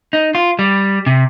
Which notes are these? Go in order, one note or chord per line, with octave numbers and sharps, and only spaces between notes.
D#4
F4
G3
C3